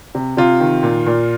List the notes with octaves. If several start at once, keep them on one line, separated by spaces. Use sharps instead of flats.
C3
C3 F4
D#3
A#2
A#2